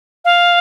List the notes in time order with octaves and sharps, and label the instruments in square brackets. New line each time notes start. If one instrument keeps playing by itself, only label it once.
[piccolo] F5